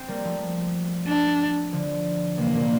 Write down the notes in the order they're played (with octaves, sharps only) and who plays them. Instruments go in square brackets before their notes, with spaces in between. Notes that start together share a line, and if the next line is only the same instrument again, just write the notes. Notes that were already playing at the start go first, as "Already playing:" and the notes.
Already playing: [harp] C4
G3 A#3
F3 A3
[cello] D4
[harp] D3 F3
[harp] C3 E3 [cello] A#3
[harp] A#2 D3